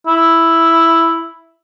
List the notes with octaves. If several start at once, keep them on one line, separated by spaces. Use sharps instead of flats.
E4